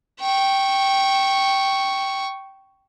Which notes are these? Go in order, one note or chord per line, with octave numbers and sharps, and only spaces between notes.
G5 C#6